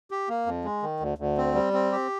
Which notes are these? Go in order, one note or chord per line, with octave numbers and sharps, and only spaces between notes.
G4
A#3
F2
G#3
D#3
D2
D2
C4
G3
C4
G4